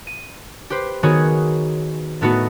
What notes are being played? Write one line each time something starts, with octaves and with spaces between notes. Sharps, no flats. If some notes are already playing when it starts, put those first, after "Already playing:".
D#7
G4 B4 C5
D#3 B3 F#4 G#4 C#5
A2 A3 B3 D#4 F#4